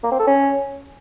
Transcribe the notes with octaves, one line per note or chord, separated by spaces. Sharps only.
A#3
C4
A4
C#4